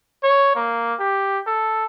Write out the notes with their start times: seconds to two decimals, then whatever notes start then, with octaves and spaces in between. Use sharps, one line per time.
0.23 C#5
0.55 A#3
0.99 G4
1.47 A4